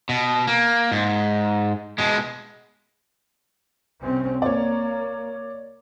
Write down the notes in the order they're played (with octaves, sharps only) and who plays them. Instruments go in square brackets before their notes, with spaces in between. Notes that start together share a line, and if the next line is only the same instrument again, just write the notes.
[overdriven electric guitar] B2
A#3
G#2
B2 G#3
[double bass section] C2 C4 C#4
[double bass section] A#3 [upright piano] C#5 D5